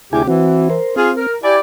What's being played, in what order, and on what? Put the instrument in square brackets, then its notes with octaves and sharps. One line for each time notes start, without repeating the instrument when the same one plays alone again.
[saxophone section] D2 C3 G4 [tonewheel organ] E4 G#4 G#5
[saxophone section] E3 [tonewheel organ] C4 F#4
[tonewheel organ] A#4 C5
[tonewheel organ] C4 [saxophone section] F4 G#4
[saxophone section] A#4
[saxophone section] E4 G4 D5 [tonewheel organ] G#5